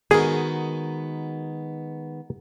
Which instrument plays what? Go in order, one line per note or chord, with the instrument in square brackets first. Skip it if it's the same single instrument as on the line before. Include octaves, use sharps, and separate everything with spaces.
[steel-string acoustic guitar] D#3 G#3 B3 [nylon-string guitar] F#4 A#4 [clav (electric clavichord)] G#4